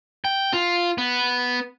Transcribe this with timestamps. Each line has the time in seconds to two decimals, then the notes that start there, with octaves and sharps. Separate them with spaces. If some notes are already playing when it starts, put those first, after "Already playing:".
0.25 G5
0.53 F4
0.98 B3